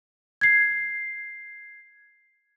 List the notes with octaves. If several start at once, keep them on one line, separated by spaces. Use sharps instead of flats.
G#6 C7